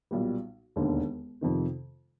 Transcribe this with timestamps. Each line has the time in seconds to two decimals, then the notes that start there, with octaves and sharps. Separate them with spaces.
0.11 B1 A#2 G3
0.76 E1 D#2 D3
1.41 F2 C3 D#3